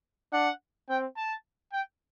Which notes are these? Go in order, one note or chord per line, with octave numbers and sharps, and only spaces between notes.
D4 F#5
C4 G5
A5
G5